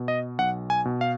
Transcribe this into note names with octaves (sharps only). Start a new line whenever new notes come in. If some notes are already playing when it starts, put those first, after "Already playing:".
Already playing: B2
D#5
B1 F#5
G#5
B2
F5